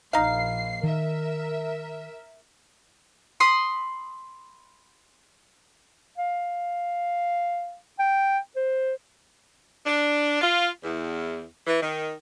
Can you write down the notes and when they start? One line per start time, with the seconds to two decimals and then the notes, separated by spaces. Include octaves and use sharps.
0.13 A#1 D#4 F5 C7
0.83 D#3 A#4 E5
3.40 B5 C6 D#6
6.18 F5
7.99 G5
8.56 C5
9.86 D4
10.41 F4
10.83 E2
11.67 E3
11.81 D#3